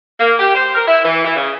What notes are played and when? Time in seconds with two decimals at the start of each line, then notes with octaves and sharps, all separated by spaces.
0.19 A#3
0.40 G4
0.55 C5
0.75 A#4
0.88 E4
1.04 E3
1.25 E3
1.37 C#3